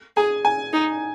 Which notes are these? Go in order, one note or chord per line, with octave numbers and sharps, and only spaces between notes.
G#4 G#5
G#5
D#4